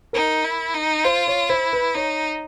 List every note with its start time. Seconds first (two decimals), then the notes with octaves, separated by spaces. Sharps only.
0.13 D#4 A#4
0.44 E4
0.74 D#4
1.04 F4 C5
1.27 C#5
1.50 E4 C5
1.73 B4
1.95 D#4 C#5